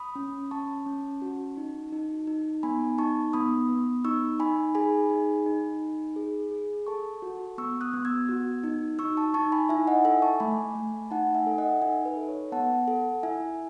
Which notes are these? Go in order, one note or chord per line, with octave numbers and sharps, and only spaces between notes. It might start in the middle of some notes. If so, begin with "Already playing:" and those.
Already playing: B5 D#6
C#4
C#4 A5 C#6
C#4
F#4
D#4
D#4
D#4
B3 G#5 B5
D#4 A5 C#6
B3 B5 D#6
B3
D#4 C#6 E6
D#4 G#5 B5
G#4 G#5 B5
D#4
D#4
D#4
G#4
G#4
A4 A5 C#6
F#4
B3 C#6 E6
D#6 F#6
B3
E6 G#6
F#4
D#4
D#4 C#6 E6
A5 C#6
D#4 A5 C#6
G#5 B5
E4 E5 G#5
D#5 F#5
A4 E5 G#5
A5 C#6
A3 G#5 B5
A3
D#4 F#5 A5
E5 G#5
A4
D#5 F#5
D#4 E5 G#5
B4
A4
C#5
B3 F#5 A5
A4
E4 E5 G#5